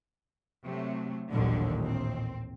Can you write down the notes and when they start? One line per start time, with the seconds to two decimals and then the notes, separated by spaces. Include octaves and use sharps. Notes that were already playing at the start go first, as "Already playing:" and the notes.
0.64 C3 F#3 A3
1.30 A1 D#2 A#2 D3 F#3 G3
1.85 C4